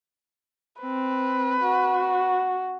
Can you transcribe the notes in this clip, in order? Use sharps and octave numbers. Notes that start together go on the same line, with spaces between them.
C4 B4
F#4